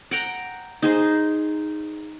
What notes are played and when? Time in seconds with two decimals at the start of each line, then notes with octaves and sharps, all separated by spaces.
0.11 F#5 G5 A#5
0.82 D#4 G#4 C5